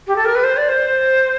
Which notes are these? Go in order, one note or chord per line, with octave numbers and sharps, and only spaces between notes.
G4
A4
A#4
B4
C5
D5
C5